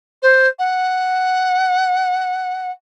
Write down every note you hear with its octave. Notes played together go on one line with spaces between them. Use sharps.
C5
F#5